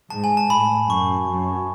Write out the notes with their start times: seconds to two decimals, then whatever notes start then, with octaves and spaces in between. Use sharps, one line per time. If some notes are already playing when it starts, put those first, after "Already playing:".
0.10 G#2 A5
0.24 G#5
0.37 A5
0.50 A2 B5
0.89 F#2 C#6
1.29 F#2